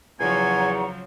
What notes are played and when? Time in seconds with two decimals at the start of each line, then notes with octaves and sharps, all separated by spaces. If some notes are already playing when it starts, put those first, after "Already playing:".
0.20 E2 C#3 F3 F#3 F#5 G#5 A#5 C#6